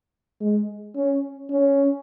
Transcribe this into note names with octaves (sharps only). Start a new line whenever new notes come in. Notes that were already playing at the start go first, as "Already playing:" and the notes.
G#3
C#4
C#4